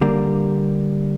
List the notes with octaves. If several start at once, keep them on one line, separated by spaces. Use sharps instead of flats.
D3 G3 A#3